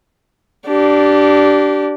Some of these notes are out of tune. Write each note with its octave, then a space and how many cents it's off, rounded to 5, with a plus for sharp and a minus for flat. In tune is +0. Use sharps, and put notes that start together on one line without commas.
D4 -5 G4 -25